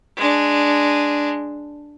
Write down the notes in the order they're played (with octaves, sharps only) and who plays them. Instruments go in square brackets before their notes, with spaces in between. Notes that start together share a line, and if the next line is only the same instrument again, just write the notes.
[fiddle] G#3 D4